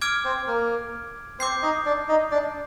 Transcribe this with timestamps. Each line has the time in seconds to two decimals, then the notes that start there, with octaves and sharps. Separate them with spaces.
0.01 D6 F6 G#6 D7
0.24 C4 C5
0.47 A#3 A#4
1.39 C4 C5 D6 G6 C7
1.62 D#4 D#5
1.85 D4 D5
2.08 D#4 D#5
2.31 D4 D5